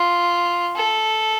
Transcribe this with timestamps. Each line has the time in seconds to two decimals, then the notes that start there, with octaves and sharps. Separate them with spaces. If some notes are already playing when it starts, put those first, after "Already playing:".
Already playing: F4
0.76 A4